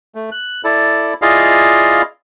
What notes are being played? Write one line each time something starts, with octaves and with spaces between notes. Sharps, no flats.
A3
F#6
E4 A4 D5
E4 F4 G#4 D5 D#5 F5